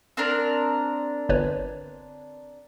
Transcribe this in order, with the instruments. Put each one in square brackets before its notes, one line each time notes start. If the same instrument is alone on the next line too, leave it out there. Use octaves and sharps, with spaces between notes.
[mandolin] C4 D4 A#4
[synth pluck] G1 B4 C#5